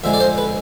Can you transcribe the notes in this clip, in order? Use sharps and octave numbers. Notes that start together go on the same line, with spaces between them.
F2 D3 G#3 E5
D5
C5
B4